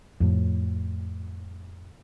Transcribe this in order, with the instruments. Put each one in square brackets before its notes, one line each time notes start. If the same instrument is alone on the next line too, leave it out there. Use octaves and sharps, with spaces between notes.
[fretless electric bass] F2 A2